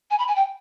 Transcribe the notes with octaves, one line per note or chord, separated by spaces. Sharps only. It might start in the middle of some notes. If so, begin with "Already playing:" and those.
G#5
B5
G#5
G5